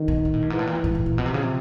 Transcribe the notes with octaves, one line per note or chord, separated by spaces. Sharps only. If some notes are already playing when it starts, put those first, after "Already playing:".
Already playing: D#3
B2
A#2
A2
G2
G#2 E3
A2
A#2
A2
G#2
A2
A#2
B2 F3
C3
C#3
C3